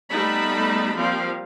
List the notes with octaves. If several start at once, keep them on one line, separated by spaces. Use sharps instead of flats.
G3 A3 B3 D#4 A5 B5
F3 G3 A#3 C4 F5